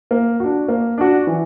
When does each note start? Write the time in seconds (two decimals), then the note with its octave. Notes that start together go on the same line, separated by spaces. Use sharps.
0.11 A#3
0.40 D4 F#4
0.68 A#3
0.98 D4 F#4
1.27 E3